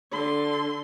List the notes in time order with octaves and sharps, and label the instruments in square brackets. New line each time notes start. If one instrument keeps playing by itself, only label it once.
[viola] D3 C6